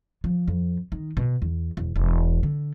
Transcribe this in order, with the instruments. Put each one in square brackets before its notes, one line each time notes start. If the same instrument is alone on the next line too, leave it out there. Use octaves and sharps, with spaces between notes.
[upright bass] F3
F2
D#3
B2
E2
E1
E1
D3